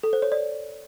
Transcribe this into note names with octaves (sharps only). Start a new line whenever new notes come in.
A4
C5
C#5
D5